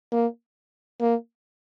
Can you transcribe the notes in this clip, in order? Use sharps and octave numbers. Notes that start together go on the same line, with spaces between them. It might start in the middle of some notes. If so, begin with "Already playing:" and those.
A#3
A#3